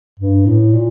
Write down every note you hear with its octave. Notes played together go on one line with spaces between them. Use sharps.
G2
A2
A#2